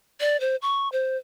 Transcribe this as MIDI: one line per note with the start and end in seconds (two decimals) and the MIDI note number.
0.21 0.39 74
0.40 0.56 72
0.62 0.89 85
0.92 1.17 72